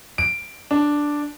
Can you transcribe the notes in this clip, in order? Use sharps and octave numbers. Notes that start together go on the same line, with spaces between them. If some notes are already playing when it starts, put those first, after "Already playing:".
D7
D4